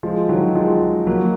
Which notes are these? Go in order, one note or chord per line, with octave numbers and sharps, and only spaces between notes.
F3 G#3
D#3 F#3
F3 G#3
F#3 A#3